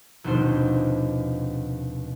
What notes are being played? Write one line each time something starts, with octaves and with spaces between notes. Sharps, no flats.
F1 D#2 B2 D4 C5